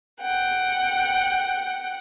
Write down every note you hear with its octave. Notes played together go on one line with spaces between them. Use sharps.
F#5 G5